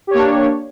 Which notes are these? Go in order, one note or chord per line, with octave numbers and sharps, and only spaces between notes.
A#3 D4 G4 C#5